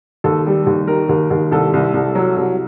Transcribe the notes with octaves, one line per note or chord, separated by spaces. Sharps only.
D#2 A4
G3
D#2
D#3 A#4
D#2
D#2
C2 A4
C2
C2
F#3
C2